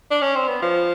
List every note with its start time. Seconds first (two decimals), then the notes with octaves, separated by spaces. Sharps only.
0.11 D4
0.22 C#4
0.35 C4
0.48 B3
0.62 F3